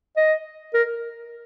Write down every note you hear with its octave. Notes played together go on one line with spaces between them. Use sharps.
D#5
A#4